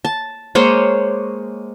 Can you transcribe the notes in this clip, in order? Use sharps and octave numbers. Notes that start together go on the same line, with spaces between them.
A5
G#3 A#3 C5 C#5